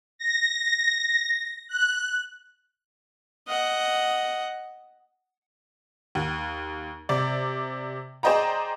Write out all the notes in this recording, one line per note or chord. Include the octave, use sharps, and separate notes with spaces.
A#6
F#6
D#5 F#5
D#2
C3 D5
G#4 C5 D5 D#5 G5 A#5